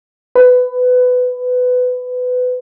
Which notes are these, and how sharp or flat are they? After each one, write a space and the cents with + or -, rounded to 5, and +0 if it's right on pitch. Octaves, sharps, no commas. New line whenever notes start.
B4 +20